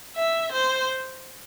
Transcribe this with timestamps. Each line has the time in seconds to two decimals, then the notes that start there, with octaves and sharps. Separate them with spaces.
0.16 E5
0.52 C5